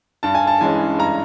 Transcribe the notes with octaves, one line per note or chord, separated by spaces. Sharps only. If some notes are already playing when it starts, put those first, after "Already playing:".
G2 A5
G#5
A5
E3 G#3 C#4 G#5
G2 A#5